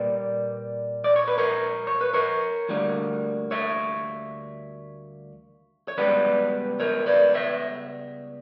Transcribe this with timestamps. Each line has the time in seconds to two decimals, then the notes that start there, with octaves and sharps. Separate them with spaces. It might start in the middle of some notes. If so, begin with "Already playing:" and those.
Already playing: A#2 G3 A#3 B4 D5
1.04 D5
1.16 C#5
1.28 B4
1.38 A#4 C#5
1.87 C#5
2.01 B4
2.14 A#4 C#5
2.69 D2 D3 G3 A#3
3.51 C#5 E5
5.88 C#5
5.98 C#2 C#3 G3 B3 B4 D5
6.80 A#4 C#5
7.06 B4 D5
7.34 C#5 E5